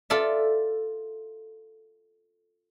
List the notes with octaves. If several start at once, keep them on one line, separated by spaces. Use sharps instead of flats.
F4 A4 D5 E5